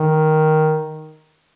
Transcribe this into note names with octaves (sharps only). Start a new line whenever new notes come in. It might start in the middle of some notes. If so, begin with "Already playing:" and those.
Already playing: D#3